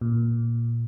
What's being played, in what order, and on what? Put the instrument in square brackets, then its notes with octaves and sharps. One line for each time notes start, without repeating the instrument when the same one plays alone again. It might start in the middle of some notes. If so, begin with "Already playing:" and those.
[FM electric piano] A#2